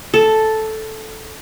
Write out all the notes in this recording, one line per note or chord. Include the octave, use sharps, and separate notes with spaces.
A4